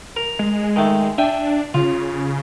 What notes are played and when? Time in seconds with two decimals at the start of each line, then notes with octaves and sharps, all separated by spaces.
0.16 A#4
0.39 G#3
0.76 D#3 A3
1.18 D4 E5 G5 G#5
1.74 C#3 F4